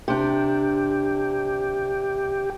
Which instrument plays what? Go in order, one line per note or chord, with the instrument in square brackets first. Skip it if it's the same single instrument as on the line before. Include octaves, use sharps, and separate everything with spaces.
[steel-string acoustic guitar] C3 D4 [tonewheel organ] G4